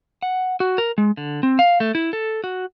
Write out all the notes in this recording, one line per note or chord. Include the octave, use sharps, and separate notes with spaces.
F#5
F#4
A#4
G#3
D3
C4
F5
A3
E4
A4
F#4